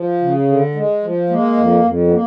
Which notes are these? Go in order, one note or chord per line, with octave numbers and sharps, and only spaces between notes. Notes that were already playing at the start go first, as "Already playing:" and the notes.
Already playing: F3
C#3
D3
G#3
F3
G#3 A#3
F2
F2
B3
A#3